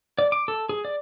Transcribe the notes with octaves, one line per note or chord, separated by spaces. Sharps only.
D5
D6
A4
G#4
D5